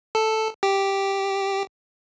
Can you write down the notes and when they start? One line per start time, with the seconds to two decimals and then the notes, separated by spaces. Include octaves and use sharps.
0.15 A4
0.63 G4